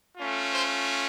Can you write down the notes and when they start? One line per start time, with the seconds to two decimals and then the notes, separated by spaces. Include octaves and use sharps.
0.17 A3 C#4 F4
0.51 C5